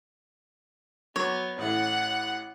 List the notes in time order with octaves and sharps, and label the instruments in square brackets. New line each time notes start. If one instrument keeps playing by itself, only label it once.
[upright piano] F#3 [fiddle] B3 [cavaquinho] C#5
[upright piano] A1 A2 [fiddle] F#5